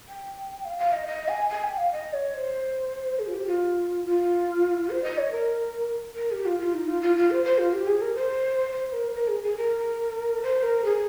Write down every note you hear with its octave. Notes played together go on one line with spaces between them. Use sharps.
G5
F5
F5
D#5
D#5
G#5
G#5
G5
F5
D#5
C#5
C5
G#4
F4
G4
F4
F4
C5
D#5
C#5
A#4
A#4
G4
F4
F4
D#4
F4
F4
F4
C5
C5
F4
G4
G#4
A#4
C5
C5
A#4
C5
A#4
G#4
G#4
A#4
C5
A#4
G#4